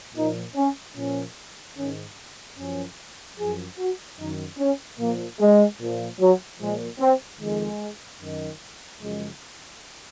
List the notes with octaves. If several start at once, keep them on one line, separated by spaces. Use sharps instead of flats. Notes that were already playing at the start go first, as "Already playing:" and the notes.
A#2 F3 D#4
C#4
A#2 F3 C#4
G#2 D#3 C#4
F#2 F3 C#4
F#2 F3 G#4
F#4
F#2 D#3 D#4
C#4
A#2 F3 A#3
G#3
A#2 F3
F#3
A#2 F3 G#3
C4
F2 D#3 G#3
F#2 D#3
F#2 C#3 F3 G#3